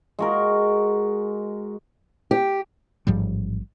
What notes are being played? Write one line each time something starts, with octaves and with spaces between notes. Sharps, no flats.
G#3 F#4 A#4
G4
A1 G#2 F3 G3